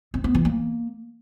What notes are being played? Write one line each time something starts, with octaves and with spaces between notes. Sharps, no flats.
C4
B3
E3
A#3